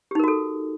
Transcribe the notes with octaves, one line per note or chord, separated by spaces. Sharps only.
D#4 F#4 G4 A4 A#4